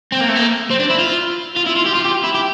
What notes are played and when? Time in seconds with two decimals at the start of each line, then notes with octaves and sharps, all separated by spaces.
0.12 C4
0.21 A#3
0.28 A3
0.36 A#3
0.71 C4
0.80 D4
0.90 E4
0.99 F4
1.57 F4
1.67 E4
1.76 F4
1.86 G4
1.95 F4
2.05 G4
2.24 E4
2.34 G4